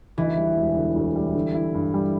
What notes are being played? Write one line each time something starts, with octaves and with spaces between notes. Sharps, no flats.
D2 E3
G3
E1
D3
D2
G3
D3
E4
G2
G3